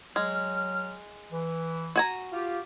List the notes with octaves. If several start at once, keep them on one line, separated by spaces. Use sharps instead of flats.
F#3 G#3 F6
E3
F#4 G#5 A#5
F4 G4